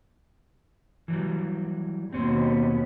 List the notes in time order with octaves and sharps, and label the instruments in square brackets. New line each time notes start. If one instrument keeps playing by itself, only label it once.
[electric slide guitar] E3 F#3 G3
[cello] D#2 B2 [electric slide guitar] C4 C#4 C5